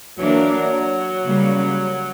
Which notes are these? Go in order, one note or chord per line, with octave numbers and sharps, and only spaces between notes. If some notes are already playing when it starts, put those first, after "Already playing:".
E3 F#3 A#3 D4 A#4
C#3 G3 A#3